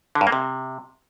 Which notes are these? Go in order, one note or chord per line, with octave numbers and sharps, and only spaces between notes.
D3
G2
A#3
C3